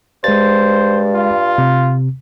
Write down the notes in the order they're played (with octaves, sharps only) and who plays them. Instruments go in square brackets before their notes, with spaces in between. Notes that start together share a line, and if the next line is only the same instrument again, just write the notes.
[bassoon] G2 [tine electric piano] G#3 A6 [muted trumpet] C5
[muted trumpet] F4
[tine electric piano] C3